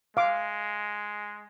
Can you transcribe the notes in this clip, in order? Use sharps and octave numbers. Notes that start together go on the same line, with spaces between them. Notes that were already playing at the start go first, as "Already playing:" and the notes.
G#3 F5 D6